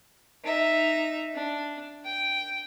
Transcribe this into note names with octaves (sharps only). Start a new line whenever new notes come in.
D#4 E5
D4
G5